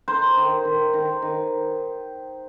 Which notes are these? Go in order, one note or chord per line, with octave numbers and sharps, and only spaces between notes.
D#4 C5
D#3
D#3
D#3
D#3